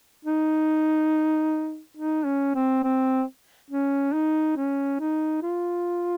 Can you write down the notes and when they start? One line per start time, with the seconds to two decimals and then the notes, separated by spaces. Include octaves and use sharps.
0.25 D#4
1.97 D#4
2.26 C#4
2.55 C4
2.84 C4
3.71 C#4
4.13 D#4
4.57 C#4
5.00 D#4
5.43 F4